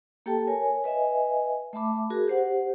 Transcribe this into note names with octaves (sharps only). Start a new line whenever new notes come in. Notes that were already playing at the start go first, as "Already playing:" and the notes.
A#3 G4 A4 G5 A5
A#4 C#5 G#5
B4 D#5 E5 G#5
A3 E5 A5 B5 D6
F#4 G#4 A#4
G4 C5 F#5